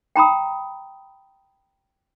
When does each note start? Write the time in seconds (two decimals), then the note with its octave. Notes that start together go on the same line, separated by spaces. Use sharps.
0.16 G5 A#5 B5 D#6